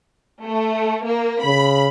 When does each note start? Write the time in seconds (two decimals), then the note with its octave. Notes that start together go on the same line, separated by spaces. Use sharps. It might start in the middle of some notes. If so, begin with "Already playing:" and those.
0.45 A3
1.06 A#3
1.45 C#3 B5